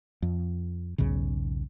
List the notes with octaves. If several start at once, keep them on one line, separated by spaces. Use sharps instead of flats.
F2
B1 E2 G#2 C#3